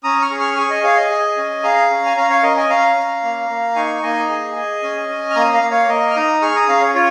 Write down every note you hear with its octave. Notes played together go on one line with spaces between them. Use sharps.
C#4 A#5 D#6
C#6 F6
G#4
C#6 F6
G#4 G#5 C#6
D#5 G#5
G#4 C#5 F5
D#5 G#5
G#4
C#4
G#4 F5 A#5
C#4
G#5
C#4 F5 A#5
C#5 F5
C#4 A#4 D#5
D#5 G#5
C#4 F5 A#5
C#4
A#3
A#3
D#4 G#5 C#6
A#3 D#5 G#5
G#4
G#4
C#4
C#4
F6
A#3 A#5 D#6
F5 A#5
A#3
C#5 F5
A#3 A#4 D#5
F6
D#4 A#5 D#6
G#4 C#6 F6
A#5 D#6
C#4 F5 A#5
C#5
F4 C#5